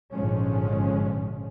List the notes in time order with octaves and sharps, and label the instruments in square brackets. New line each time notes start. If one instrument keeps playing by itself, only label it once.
[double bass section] G#1 A#2 D3 F3 G#3 C#4